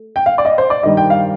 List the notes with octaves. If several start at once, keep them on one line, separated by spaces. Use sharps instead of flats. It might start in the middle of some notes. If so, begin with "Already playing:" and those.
Already playing: A3
G5
F5
D5
D#5
C5
D5
G2 D#3 G3 D#5
G5
F5